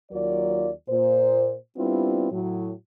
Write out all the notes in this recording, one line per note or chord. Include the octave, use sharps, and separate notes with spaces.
D#2 F#3 F4 A#4 D5
A#2 C5
G3 B3 C4 D4 E4 F4
A2 F#3